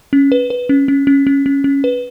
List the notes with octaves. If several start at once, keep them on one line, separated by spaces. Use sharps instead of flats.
C#4
B4
B4
C#4
C#4
C#4
C#4
C#4
C#4
B4